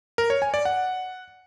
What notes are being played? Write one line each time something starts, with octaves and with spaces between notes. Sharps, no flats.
A#4
C#5
G#5
D5
F#5